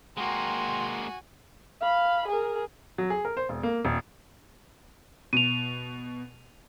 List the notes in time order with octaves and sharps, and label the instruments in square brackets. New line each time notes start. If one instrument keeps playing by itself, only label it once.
[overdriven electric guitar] G#3 A#3 [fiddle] F#4 G#5 [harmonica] G5 A#5 C6
[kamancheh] F5 B5
G#4 A#4
[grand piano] F#3
G#4
A#4
C5
E1
A#3
D#1
[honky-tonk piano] B2 [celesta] D#7 F7